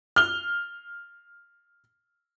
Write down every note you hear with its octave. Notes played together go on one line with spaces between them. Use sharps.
F6 G7